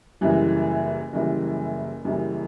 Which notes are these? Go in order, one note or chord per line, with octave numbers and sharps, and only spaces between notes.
F#1 F#2 E3 G3
F#1 F#2 E3 G3
F#1 F#2 E3 G3